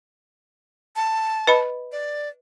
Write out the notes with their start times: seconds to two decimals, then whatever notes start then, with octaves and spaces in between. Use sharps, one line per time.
0.96 A5
1.47 B4 D#5 B5
1.92 D5